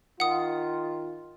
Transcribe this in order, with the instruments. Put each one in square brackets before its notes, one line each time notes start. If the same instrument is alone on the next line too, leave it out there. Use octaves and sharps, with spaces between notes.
[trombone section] D#3 F4 [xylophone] F#5 D#6